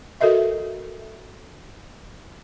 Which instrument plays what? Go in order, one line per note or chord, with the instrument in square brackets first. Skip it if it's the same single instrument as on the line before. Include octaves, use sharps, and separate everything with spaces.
[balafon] F#4 A4 A#4 D#5 E5